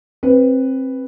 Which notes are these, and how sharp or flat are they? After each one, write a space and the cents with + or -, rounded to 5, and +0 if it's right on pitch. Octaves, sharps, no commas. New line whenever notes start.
C4 +20 B4 +0